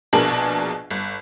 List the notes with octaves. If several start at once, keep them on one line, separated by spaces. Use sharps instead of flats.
A#1 B2 D4 G#4 A#4 F#7
G1